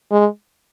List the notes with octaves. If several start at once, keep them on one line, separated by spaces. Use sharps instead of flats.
G#3